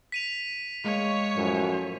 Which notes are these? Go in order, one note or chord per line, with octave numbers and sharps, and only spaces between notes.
B6 D#7 F7
G#3 A#3 C#5
F#2 A2 F3